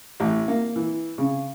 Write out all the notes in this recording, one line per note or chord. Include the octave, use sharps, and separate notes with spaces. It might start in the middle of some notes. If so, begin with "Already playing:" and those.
A1
A#3
E3
C#3